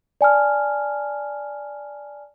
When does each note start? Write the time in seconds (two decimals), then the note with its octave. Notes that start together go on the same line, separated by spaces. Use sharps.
0.21 D5 G#5 A5 F6